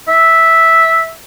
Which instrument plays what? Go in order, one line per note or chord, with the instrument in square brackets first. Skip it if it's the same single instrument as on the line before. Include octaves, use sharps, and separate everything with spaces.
[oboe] E5